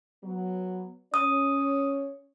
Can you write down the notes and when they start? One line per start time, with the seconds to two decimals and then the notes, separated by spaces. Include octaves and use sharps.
0.24 F#3 B3
1.14 C#4 C#5 D#6